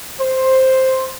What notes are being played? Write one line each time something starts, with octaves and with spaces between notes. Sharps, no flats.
C5